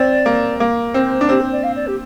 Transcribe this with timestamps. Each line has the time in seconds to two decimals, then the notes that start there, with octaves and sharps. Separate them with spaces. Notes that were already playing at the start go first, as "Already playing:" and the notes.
Already playing: C4 D5
0.26 A#3
0.60 A#3
0.94 C4 C5
1.21 D4
1.29 C4 G4
1.40 C5
1.52 D5
1.63 F5
1.75 D5
1.87 G4